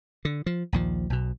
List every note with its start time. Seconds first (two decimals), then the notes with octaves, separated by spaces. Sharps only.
0.25 D3
0.46 F3
0.72 A#1 D#2 F3
1.10 B1 B2